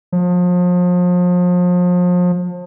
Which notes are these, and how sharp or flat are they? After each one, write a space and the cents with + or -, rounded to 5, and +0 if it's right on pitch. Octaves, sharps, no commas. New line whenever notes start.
F3 +35